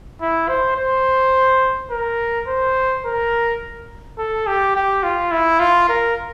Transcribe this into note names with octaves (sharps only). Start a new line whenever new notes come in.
E4
C5
C5
A#4
C5
A#4
A4
G4
G4
F4
E4
F4
A#4